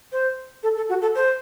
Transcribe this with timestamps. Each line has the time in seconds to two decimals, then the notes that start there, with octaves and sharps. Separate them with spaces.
0.12 C5
0.63 A4
0.76 A4
0.89 F#4
1.01 A4
1.15 C5